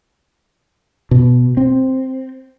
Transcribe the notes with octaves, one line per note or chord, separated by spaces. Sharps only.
B2
C4